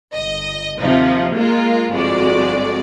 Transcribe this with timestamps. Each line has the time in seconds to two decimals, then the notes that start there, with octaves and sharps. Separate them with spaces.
0.13 G1 D#5
0.80 D#2 C3 F3 D#4
1.35 G#3 A#3 F4 A#4
1.91 G1 F2 G#3 F#4 D5